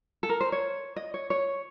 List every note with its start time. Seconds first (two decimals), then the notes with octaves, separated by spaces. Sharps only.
0.23 A4
0.29 A#4
0.41 C5
0.52 C#5
0.96 D#5
1.14 C#5
1.30 C#5